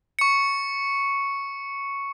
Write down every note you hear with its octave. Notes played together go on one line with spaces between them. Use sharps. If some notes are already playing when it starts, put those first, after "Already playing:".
C#6 C#7